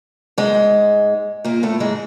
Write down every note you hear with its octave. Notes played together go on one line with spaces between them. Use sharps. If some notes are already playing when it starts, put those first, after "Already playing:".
G#2 G#3
A#2 A#3
A2 A3
G#2 G#3